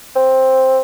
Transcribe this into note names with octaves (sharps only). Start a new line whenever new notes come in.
C4